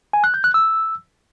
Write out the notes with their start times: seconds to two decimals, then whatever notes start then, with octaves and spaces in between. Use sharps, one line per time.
0.13 G#5
0.24 F#6
0.34 G6
0.44 F#6
0.54 E6